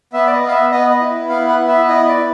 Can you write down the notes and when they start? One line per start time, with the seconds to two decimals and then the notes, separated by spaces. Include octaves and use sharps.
0.13 B3 E5
0.27 D5
0.32 D#5
0.42 B3
0.48 F5
0.51 E5
0.71 B3 D#5
0.90 D#5
1.00 E4
1.29 B3 F5
1.49 F#5
1.60 B3
1.68 E5
1.88 E4 D#5
2.08 D5
2.17 E4